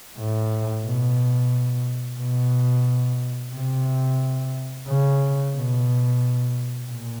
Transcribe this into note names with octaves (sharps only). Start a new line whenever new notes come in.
A2
B2
B2
C3
C#3
B2
A#2